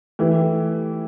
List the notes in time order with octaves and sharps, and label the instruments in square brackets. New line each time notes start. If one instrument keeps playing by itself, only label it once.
[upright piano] E3 A3 E4 G4